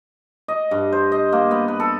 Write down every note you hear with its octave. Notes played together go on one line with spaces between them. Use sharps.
D#5
G2
C5
D#5
A#3
B3
B4
A4